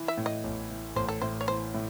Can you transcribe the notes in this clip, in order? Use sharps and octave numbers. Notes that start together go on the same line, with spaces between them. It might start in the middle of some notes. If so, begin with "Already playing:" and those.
Already playing: E3
E5
A2
D#5
A1
E3
A1 C5
A4
A2 C5
C#5
E3 C5
A2